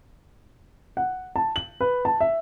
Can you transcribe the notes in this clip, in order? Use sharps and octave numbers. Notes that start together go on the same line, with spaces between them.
F#5
A5
F#7
B4
A5
E5